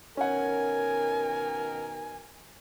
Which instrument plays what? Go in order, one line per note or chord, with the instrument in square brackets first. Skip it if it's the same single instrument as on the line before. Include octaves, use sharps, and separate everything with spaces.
[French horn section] B2 D#3 A#4 [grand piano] C#4 F#5 [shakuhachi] G#5